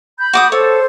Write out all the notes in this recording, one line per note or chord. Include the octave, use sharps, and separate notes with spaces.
B5 G6
F#4 D6 D#6
A4 C5 C#5